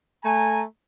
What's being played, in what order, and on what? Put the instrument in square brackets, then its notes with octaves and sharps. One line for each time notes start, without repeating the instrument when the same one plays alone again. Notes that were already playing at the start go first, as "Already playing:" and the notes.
[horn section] A3 G#5 A#5